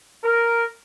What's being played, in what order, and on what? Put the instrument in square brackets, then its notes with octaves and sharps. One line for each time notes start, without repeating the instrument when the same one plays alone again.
[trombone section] A#4